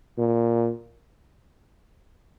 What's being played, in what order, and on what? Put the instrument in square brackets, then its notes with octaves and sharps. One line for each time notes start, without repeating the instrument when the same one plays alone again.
[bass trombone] A#2